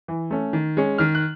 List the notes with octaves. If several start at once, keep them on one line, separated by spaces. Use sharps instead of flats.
E3
A3 C#4
D#3
G#3 C#4
D#3 F6
F#6